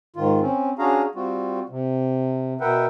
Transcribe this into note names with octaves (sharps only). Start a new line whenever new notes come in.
G#2 D#3 F4
C4 C#4
C#4 D4 F#4 G#4 F5 A#5
G3 C4 F4 F#4
C3
B2 A#4 B4 E5 F#5 G5